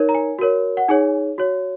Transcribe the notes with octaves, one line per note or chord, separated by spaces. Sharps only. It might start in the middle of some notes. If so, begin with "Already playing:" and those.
Already playing: D#4 A#4 C#5
A#5
G#5
F#4 A#4 C#5
F#5
D#4 G#4 C#5 G#5
F#4 C#5